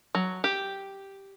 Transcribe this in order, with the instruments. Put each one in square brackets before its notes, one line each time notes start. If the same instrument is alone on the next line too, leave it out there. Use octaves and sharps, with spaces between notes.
[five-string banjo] F#3
G4